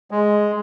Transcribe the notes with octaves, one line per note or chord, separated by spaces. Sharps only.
G#3